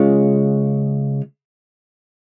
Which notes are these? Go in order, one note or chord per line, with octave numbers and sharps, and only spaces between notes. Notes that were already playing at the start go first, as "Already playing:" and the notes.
Already playing: C#3 G#3 C#4 F4